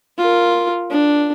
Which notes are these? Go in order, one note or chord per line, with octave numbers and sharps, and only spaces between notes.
F4 A#4
D4